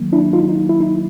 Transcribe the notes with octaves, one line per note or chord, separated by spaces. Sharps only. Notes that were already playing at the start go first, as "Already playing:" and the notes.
Already playing: D#3 F#3 A#3
D4 E4
D#4 F4
D#4
E4
D#4